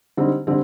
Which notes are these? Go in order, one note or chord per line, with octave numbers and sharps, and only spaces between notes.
D3 G3 C4 D#4
D3 G3 C4